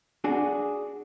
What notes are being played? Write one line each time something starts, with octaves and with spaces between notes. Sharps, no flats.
D4 F#4 G#4